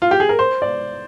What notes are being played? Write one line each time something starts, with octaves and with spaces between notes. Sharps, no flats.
F4
G4
G#4
A#4
C5
D5